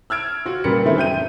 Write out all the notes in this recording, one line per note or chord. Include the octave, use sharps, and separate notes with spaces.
E6 F6 G#6 D7
F4 F#4
A#2 C#3 G3 A#4 B4 C#7
D#3 E3 A3 C4 E4
F#2 G5 G6 D#7